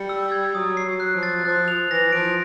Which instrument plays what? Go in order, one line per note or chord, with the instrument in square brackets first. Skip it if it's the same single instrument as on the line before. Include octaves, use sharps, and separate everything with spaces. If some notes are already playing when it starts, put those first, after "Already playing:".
Already playing: [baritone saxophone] G3 [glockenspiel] C#7
[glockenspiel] E6
G#6
[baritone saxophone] F#3 [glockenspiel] D#6
[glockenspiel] C7
[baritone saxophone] F#3
[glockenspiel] F#6
[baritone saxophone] F3
[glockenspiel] A6
[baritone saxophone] F3 [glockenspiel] F#6
[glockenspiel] F7
[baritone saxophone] E3 [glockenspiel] A#6
[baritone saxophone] F3 [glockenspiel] D7